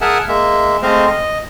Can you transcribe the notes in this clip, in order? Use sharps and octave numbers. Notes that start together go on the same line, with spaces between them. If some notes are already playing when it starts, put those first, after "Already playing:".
G#4 A#4 E5 F#5 G#5 A5
G#3 A#3 E5
G#3 A3 C4 C5 D#5 F5
D#5